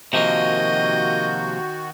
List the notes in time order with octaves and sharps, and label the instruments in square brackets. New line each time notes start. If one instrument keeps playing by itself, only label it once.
[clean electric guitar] C3 F3 A#3 [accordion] D#3 F#4 [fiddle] D#5 [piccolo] G6